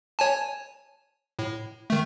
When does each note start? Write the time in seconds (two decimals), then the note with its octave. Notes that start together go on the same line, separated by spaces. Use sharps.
0.19 C#5 G#5 A5
1.39 A2
1.90 D#3 A3